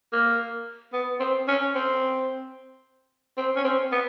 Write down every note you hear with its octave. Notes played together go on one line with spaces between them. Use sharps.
A#3
B3
C4
C#4
C4
C4
C#4
C4
B3